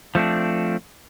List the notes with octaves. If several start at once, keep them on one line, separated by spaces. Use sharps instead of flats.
F3 A3 C4 D4